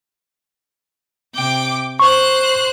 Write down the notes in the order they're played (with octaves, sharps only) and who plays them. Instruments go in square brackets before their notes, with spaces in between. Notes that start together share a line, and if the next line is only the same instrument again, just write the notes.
[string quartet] C3 G5 D6
[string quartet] C5 F#6 [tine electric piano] C#6